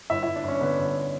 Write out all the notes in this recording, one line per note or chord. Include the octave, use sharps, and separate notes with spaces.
G1 E4 E5
E4 E5
G1
D4 D5
G1 C#4 C#5
D3 B3 B4
G1